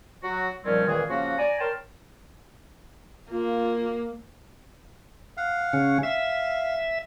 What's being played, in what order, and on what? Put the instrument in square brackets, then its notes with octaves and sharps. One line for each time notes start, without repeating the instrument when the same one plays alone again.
[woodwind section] F#3 F#4
A#2 D#3 F3 G3 C4 C#4
C#2 A#2 D#3 E3 G#4
C#3 F3 A#3 C#4 F#4
D5 G#5 A#5
A#4 C#5 G5 A5 C6 F6
[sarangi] A#3 [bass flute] F4
[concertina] F5 F#5
[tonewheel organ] C#3 C#4
[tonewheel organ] E5 [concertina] F5